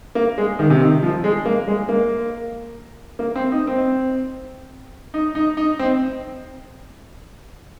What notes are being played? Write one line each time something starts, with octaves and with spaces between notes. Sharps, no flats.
A#3
G#3
D#3
C3
D#3
F3
G#3
A#3
G#3
A#3
A#3
C4
D#4
C4
D#4
D#4
D#4
C4